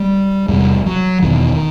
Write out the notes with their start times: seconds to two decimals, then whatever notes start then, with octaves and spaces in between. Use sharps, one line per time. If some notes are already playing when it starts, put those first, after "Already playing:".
Already playing: G3
0.48 E2 C3 G3
0.86 F#3
1.22 E2 B2 D#3